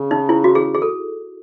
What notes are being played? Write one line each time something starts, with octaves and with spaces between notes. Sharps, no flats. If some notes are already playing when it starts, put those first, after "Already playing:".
Already playing: C#3
D#4
E4
F#4
G#4
G#4
A4